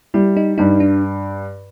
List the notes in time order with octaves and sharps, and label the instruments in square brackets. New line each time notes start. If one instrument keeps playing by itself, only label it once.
[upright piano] G3 [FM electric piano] E4
[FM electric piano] D#4
[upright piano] G2 [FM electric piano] D#4
[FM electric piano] D4